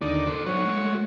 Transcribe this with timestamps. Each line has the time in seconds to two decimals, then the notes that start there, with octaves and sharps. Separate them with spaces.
0.01 D#2 D3 D#4 D5
0.27 A4 C5
0.46 F#3 D#4 F#4 C#5
0.65 G#3 A3